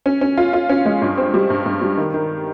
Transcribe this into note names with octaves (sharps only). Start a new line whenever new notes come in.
C#4
C#4
F4
F4
C#4
G#3
G2
C4
G3
G2
G2
G3
D#3
D#3